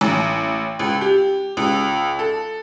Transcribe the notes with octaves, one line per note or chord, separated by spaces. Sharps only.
A1
C#2
G4
C#2
A4